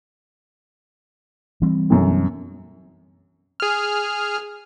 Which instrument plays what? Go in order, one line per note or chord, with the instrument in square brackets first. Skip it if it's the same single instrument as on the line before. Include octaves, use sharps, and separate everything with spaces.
[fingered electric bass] E3 G3 C4
[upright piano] B1 F#2
[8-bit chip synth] G#4 F6